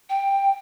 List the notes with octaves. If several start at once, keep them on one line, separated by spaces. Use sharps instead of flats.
G5